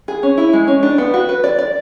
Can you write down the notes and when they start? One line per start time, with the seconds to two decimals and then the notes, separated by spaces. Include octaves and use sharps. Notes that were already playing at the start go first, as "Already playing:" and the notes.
0.08 G#4
0.23 C#4
0.38 E4
0.53 G#3
0.68 C#4
0.83 D4
0.98 B3
1.14 F#4
1.29 B4
1.44 D5
1.59 D5